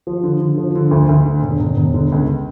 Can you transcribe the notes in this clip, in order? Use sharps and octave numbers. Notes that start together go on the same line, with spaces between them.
F3
D3
D3
F3
D3
D2
D2
D3
E1
E1
E1
D3
C#2